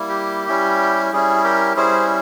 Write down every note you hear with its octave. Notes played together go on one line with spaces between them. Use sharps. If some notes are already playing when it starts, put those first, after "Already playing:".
Already playing: G3 A#3 E4
G4
G3 C#4 E4
G3 C#4 E4 G#4
G4 A#4
G3 C#4 E4 G#4 C5